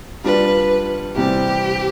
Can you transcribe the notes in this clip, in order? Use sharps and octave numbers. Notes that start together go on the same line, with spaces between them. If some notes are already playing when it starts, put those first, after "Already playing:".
G3 D4 F4 B4
C3 E3 G3 C4 G4